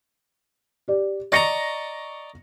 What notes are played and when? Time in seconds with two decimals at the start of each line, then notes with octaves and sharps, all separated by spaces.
0.88 G4 D5
1.32 D5 D#5 A#5 C#6 A#6 C#7